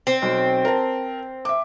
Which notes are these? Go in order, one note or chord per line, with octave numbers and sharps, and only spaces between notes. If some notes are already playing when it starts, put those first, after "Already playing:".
C4
B1
A#4 A5
E5 D6